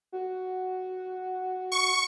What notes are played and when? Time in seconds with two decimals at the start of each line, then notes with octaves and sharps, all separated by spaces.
0.12 F#4
1.72 C#6